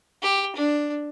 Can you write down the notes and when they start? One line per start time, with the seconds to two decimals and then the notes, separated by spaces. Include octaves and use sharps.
0.22 G4
0.56 D4